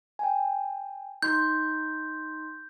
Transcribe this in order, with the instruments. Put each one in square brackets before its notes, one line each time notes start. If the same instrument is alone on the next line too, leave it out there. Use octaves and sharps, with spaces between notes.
[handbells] G5 G#5
[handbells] D#4 C6 [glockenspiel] G6